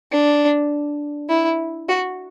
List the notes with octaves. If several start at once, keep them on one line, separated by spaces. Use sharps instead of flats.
D4
E4
F#4